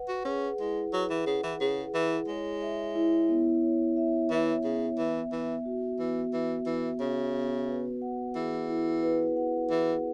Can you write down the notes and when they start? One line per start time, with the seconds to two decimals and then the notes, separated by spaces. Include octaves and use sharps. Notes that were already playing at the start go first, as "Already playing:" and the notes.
Already playing: B4 F#5
0.08 F#4
0.25 C#4 G#4
0.59 G#3 E4
0.93 F#3 B4
1.10 E3
1.26 C#3 F#5
1.43 E3
1.60 C#3 G#4
1.94 E3 E4
2.28 G#3 C#5
2.62 E5
2.95 E4
3.29 B3
3.63 C#5
3.97 E5
4.30 E3 E4
4.64 C#3 B3
4.98 E3 E5
5.32 E3 B3
5.65 F#4
5.99 E3 B3
6.32 E3 E5
6.66 E3 B3
7.00 C#3 F#4
7.34 B3
7.68 B4
8.02 F#5
8.35 E3 G#4
8.69 E4
9.03 B4
9.36 F#5
9.70 E3 G#4